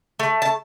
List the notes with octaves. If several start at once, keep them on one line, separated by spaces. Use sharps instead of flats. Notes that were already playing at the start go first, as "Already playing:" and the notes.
A3
A5